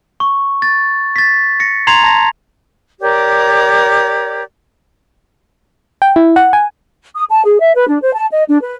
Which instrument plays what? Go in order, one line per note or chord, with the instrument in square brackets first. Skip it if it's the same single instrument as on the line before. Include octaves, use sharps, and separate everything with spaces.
[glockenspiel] C#6
A6
A6 B6
A#6 C#7
A#5 C6 G#6 C7 F7
A5 A#6
[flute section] G4 A#4 C#5 D5
[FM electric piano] G5
E4
F#5
G#5
[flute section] D#6
A5
G#4
E5
B4
D4
C5
A5
D#5
D4
B4